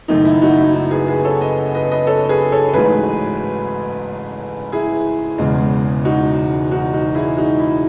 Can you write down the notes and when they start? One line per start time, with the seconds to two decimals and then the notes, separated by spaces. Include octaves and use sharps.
0.08 F#1 F#2 D#3 A3 D#4
0.25 E4
0.42 D#4 F#4
0.58 E4
0.74 D#4
0.91 G#4 B4
1.08 G#4 B4
1.25 A4 C#5
1.41 B4 D#5
1.75 B4 D#5
1.91 B4 D#5
2.07 A4 C#5
2.29 G#4 B4
2.52 A4 C#5
2.73 A1 G#2 F#3 A3 G#4 B4
4.72 E4 G#4
5.38 E1 E2 C#3 G#3
6.05 D#4 F#4
6.71 D#4 F#4
6.93 D#4 F#4
7.15 E4 G#4
7.37 D#4 F#4
7.59 E4